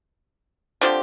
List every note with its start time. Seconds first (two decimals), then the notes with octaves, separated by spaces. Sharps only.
0.81 D3 F3 C4 G4